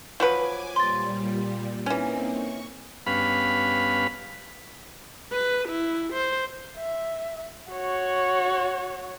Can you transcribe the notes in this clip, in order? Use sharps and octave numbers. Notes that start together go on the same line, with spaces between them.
F3 F#3 B4 G#5 D6
A#2 G3 C6 A6
E3 A#3 C4 C#4 D#4
C#6
G2 B3 C#4 B4 F5 B5
B4
E4
C5
E5
F#4 C#5